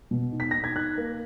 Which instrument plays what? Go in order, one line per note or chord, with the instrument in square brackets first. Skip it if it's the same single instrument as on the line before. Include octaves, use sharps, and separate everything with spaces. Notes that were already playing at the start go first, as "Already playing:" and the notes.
[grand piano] B2
D#4
B6
D#4 A#6
G#6
D#4 F#6
A#3